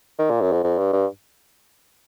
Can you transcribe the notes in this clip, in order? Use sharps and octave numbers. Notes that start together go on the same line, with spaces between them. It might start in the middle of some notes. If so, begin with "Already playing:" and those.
D#3
A#2
F#2
F2
F2
G2
G2